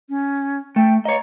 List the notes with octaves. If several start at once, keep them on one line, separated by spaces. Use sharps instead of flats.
C#4
A3 G5
C#5 D#5 A#5